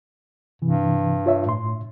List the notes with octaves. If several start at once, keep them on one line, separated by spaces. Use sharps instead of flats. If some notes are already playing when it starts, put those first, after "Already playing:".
G2 C3 E3
F4 C#5 E5
A2 C6